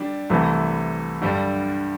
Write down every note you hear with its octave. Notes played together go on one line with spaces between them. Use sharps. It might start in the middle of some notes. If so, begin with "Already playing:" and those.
Already playing: D3 G3 D4
C2 C3 E3 A3 E4
G2 D3 G3